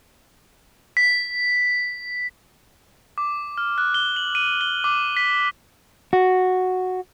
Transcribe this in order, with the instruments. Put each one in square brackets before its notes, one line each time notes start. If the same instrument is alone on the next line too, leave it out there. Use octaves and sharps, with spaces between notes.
[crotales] B6
D6
F6
F#6
G7
F#7
D#7
G7
D6
B6
[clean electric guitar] F#4